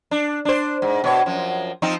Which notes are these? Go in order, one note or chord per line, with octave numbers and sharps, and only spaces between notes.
D4
D4 C5
G#2
B2 C#5
F#2 F3
F3 C4 D#4